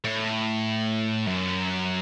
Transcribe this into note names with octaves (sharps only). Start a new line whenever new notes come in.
A2
F#2